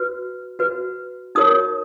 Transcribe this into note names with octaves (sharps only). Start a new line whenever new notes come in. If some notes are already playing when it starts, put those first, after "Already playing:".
Already playing: F#4 B4
F#4 B4
D#4 F#4 A#4 C#5 D#6